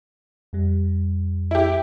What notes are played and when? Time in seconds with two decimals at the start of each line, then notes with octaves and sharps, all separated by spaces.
0.53 F2 G3
1.51 E4 G4